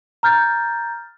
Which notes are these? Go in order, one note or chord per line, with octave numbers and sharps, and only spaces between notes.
A#5 F6 G6 A6